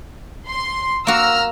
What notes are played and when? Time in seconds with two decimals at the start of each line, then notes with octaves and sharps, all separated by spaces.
0.48 C6
1.07 A#3 F#4 A#5 E6 F6